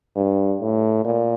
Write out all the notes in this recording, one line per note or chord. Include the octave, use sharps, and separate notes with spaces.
G2
A2
A#2